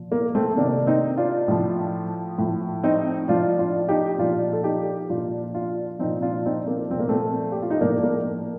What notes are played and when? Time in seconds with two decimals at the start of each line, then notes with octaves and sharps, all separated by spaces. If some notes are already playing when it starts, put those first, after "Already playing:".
Already playing: A#2 F3
0.12 A#3
0.35 A3 C4
0.57 C3 D#3 A#3 D4
0.87 C4 D#4
1.17 D4 F4
1.48 A2 F3
2.38 A2 F3
2.83 C4 D#4
3.28 A2 F3 D4 F4
3.59 D4 F4
3.88 D#4 G4
4.18 A#2 F3 D4 F4
4.53 A4
4.64 D#4 G4
5.10 A#2 F3 D4 F4
5.54 D4 F4
5.99 A#2 F3 C4 D#4
6.22 D4 F4
6.46 C4 D#4
6.67 A#3 D4
6.90 A#2 F3 C4
7.00 A#3
7.09 A3 C4
7.52 G4
7.62 F4
7.70 D#4
7.80 A2 F3 A#3 D4
8.04 A#3